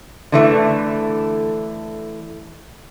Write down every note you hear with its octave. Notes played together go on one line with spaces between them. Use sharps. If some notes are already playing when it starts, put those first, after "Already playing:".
D3 E3 A3